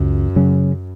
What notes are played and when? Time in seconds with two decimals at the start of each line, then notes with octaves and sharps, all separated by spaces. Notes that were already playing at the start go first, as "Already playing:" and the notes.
Already playing: C#2 F#2
0.36 C#3 F#3 C#4